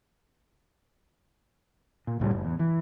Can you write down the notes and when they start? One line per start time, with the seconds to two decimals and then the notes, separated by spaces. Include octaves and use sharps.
2.07 A#2
2.20 C#2 A2 C#3 G3
2.31 F#1
2.45 E2
2.59 E3